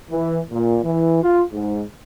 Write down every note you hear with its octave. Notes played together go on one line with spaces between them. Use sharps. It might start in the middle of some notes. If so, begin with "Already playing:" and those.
E3
A#2
E3
F4
G#2